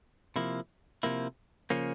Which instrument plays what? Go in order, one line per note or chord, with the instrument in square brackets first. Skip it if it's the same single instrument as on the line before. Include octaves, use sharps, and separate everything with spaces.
[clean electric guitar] C3 F3 A#3 E4
C3 F3 A#3 E4
C#3 F3 A#3 C#4